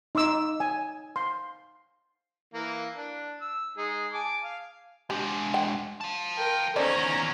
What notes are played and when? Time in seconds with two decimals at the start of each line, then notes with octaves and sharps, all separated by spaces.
0.15 D#4 C6 D6 E6
0.60 G#5
1.16 C6
2.54 E3 A#3 F5
2.97 D4
3.41 E6
3.78 G#3 D#4 G#4
4.13 G#5 A5 D6
4.44 F5
5.10 G#3 D4 G4
5.54 F#5 G5
6.01 F5 A5
6.37 A#4 G5
6.76 E2 D#3 C#4 A4 C5 D5 A#5